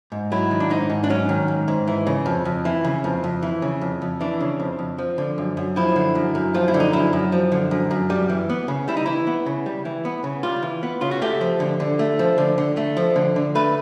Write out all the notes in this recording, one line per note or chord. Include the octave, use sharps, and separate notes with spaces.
G#2
F#3 E4
D#3
D4
G#2 D#4
G#2
D4
F#3 C#4
D#3
G#2
G#2
E3
C#3
F2
F2
E3
C#3
F2
F2
E3
C#3
F2
F2
E3 D4
C#3
F2
F2
F3
D3
F#2
F#2
F3 E4
D3
F#2
F#2
F3 F4
E4
D3
D#4
F#2 E4
F#2
F3
D3
F#2
F#2
G3
E3
B3
C#3
G3 E4
D#4
E3 E4
B3
C#3
G3
E3
B3
C#3
G3 F4
E3
B3
C#3 F4
F#4
A3 G4
F3
D3
D3
A3
F3
D3
D3
A3
F3
D3
D3
A3 B4